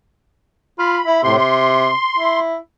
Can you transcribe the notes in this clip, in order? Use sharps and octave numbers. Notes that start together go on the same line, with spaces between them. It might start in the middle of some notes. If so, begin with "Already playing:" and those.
F4 B5
E4
A2 C3 C6
C6
E4